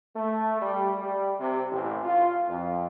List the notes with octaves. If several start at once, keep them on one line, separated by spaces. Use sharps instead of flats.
A3
G3
G3
C3
A1
F4
F2